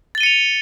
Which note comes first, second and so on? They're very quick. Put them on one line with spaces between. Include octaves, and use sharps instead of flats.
A6 G7 D#7 C#7 F7